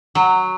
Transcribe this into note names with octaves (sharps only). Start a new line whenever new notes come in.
F#3